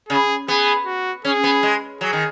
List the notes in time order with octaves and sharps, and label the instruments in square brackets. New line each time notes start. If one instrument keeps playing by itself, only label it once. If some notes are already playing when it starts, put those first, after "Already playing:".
[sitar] C#3 [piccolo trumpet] G#4
[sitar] B3 [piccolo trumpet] G#4
[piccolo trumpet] F#4
[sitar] C#4 [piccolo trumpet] G#4
[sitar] B3
G#3
[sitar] F#3 [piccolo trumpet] G#4
[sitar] D#3